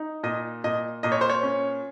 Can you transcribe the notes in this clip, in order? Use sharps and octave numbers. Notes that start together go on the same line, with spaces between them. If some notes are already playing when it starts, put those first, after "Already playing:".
Already playing: D#4
A#2 D#5
A#2 D#5
A#2 D#5
C#5
C5
C#5
C#4